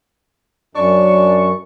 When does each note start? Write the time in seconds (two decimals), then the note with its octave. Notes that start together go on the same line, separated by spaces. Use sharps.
0.75 F#2 D4 C#6